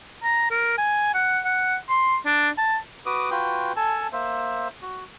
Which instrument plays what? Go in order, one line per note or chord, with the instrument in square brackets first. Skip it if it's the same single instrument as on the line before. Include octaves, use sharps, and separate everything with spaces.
[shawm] A#5
A#4
G#5
F#5
F#5
C6
D4
A5
[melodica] F#4 B4 D6 D#6
F4 F#4 B4 G5
A4 G#5 A5
A#3 C5 E5
F#4